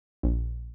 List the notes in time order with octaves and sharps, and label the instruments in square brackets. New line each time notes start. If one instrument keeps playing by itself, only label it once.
[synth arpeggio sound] A#1